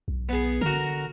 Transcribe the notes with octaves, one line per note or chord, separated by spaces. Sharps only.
B1
B3 G#4
D3 F#4 A#4